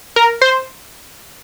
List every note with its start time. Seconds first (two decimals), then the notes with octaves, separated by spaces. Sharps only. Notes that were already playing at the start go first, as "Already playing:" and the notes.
0.16 A#4
0.41 C5